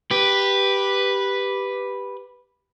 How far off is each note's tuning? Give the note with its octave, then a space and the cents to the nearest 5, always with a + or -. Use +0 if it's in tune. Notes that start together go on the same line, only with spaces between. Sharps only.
G4 +0 B4 -5